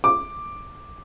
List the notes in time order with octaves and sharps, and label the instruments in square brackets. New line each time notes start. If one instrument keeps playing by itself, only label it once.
[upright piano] D6